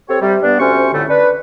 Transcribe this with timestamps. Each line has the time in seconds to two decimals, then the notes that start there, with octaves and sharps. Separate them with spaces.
0.09 C4 G4 A4 C#5
0.22 C3 G3
0.43 G2 G3 B3 D4
0.60 D2 C3 C#4 C5 C#6
0.93 F2 A2 D3 G3 A3
1.10 D4 B4